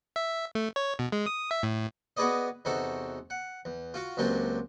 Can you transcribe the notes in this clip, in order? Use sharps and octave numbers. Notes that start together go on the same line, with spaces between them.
E5
A3
C#5
B2
G#3
D#6
E5
A2
B3 F#4 G#4 B4 D5 D#5
E2 C3 D#4 F#4 A4
F#5
E2
F4 F#4 F5
C#2 A#2 F#3 C4 G4 A5